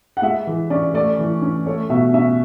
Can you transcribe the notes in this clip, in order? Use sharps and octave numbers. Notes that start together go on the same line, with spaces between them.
F#5
G#3 E5
E3
C#4 D5
A3 D5
E3
C#4
A3 C#5
B2 E5
C#4 E5